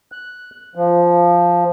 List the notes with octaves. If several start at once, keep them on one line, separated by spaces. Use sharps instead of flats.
F#6
F3